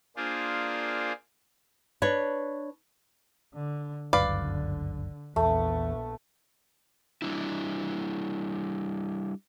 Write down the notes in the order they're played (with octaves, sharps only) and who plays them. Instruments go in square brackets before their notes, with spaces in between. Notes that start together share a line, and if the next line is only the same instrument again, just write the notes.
[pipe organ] A#3 D4 F4 G#4 C5
[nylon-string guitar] D4 B4 C#5
[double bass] D3
[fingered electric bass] G1 C#2 F#2 [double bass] D3 [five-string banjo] B4 D5 F5
[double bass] A#1 B3 [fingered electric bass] E2 [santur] A3
[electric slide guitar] G3 D4 E4